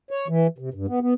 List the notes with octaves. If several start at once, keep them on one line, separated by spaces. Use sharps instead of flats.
C#5
E3
C3
G2
B3
B3